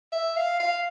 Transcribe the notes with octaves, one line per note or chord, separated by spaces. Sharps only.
E5
F5
F5